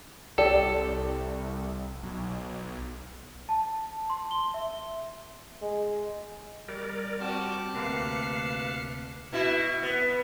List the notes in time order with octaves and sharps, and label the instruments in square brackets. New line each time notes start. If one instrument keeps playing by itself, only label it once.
[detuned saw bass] C2 [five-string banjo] G4 D5 [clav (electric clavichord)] A4
[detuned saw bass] B1
[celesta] A5
C6
G7
E5
[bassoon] G#3
[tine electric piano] G3 [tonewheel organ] A#4 D5
[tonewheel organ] C4 [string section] F#4 G4 [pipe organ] A5 D6 F6
[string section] D2 C7 C#7 [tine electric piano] C3 A#3 [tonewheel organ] B4 F5
[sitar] B2 E4
B3